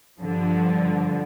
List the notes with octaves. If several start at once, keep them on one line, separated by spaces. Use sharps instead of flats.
G2 D3 F3